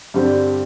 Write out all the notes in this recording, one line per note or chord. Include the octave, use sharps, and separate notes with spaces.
G2 D3 G3 C4 G4